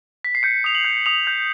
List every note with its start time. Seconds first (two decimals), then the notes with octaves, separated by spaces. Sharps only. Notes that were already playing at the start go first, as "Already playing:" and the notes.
0.25 B6
0.35 C7
0.43 G6 C#7
0.64 D#6 F7
0.75 F#7
0.85 G6
1.06 D#6 F7
1.27 G6